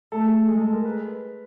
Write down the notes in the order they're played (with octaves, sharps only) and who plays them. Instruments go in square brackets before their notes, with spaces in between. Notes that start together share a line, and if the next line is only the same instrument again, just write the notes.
[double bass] A3 [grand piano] A4
[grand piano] G#4
[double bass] G#3 [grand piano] G#4
[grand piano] A4
A#4
B4